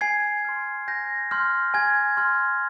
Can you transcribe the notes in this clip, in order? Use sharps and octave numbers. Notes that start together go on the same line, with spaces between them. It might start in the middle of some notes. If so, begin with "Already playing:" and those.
G#5 G#6 C7
C6 F6
G#5 G6 A#6
C6 F6 G6
G#5 G#6
C6 F6